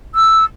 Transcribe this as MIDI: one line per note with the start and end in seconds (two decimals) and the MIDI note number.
0.14 0.43 88